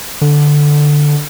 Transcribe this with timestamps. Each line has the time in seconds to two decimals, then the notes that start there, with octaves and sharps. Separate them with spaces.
0.21 D3